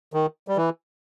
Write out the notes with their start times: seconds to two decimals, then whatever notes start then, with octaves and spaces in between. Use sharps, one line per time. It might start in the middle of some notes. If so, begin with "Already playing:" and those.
0.13 D#3
0.48 G3
0.57 E3